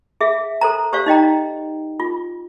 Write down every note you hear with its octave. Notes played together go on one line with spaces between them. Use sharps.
G#4 E5 F5
A4 C5 A#5
G4 C5 D5 F5
D#4 D#5 G5 A#5
F4